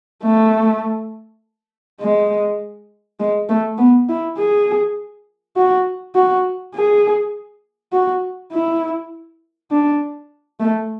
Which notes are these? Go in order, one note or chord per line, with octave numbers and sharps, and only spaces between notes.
A3
G#3
G#3
A3
B3
E4
G#4
F#4
F#4
G#4
F#4
E4
D4
A3